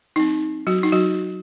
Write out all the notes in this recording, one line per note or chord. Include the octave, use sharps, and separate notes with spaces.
F#3 C4 D#4
F#3 F#4
D#4
F#3 F#4